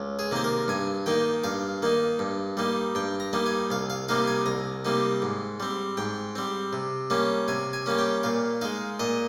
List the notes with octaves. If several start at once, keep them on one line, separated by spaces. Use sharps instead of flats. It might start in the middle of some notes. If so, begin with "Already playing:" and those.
Already playing: C#2
G#4
C3 D#3 A#3 C5
A#4
G2 G#5
D#3 A#3 D#4 G5
G2 F5
D#3 A#3 D#4
G2
G3 A#3 D#4
G2 G5
A#5
G3 A#3 D#4
G#5
C2 F5
F5
C3 G3 A#3 D#4 F5
G#5
C2 A#5
C3 G3 A#3 D#4
G#2
G3 C4
G#2 G5
G3 C4
C3
G3 A#3 C#4
C3 G#5
G#5
G3 A#3 C#4
G5
A#2 F5
G#3 D#4 F5
A#2 D#5